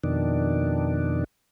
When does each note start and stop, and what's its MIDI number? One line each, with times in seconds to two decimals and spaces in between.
0.04 1.24 41
0.04 1.24 47
0.04 1.24 51
0.04 1.24 62